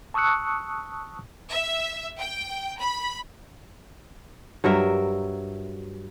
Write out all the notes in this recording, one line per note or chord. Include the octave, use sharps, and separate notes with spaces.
A5 C#6 D#6 E6 F#6 C#7
E5
G5
B5
G2 F#3 A#4 E5